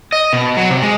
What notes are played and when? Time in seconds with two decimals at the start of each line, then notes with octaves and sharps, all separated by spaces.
0.13 D#5
0.33 B2
0.57 F#3
0.70 C3
0.82 G#3